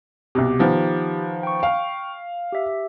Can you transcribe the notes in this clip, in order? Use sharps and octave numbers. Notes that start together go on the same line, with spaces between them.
C2 B2 G4
D#3 F3 B3
G5 C#6
F5
G4 E5